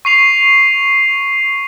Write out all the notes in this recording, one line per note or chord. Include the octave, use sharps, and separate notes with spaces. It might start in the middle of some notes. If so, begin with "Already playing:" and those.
C#6 C7 F7